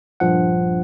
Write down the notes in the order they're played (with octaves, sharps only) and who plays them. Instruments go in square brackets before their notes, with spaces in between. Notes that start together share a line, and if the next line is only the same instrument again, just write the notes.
[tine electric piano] A#1 G2 F3 F#5